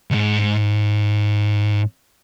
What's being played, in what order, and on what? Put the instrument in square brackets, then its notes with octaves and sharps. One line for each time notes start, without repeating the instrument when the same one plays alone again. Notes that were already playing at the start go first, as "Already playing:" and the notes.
[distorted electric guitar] C2 G#2